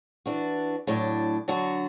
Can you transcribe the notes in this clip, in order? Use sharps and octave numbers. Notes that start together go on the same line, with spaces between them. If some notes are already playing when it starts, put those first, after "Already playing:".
E3 D4 F#4
A2 F#3 D4
D3 F#3 D4 F#4